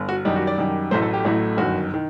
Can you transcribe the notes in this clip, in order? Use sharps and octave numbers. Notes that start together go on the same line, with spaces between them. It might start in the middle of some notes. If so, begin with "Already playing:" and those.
Already playing: G1
F#4
F#2 D#3 G3 D#4
F#4
D5
F#2 D#3 G3
A1 A2 F#3 A3 C5
A4
G4
A1 A2 F#3 A3
G1 F#2 D#3 F#4
D#3